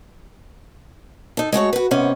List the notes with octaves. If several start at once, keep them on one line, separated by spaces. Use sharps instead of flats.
D#4 A4
G#3 A3 F#4 C#5
F#4 B4
G#2 C3 B3 C#4